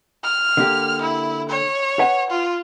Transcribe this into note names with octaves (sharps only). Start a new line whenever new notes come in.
F6
D3 A#3 G4
E4
C#5
B4 F#5 G#5
F4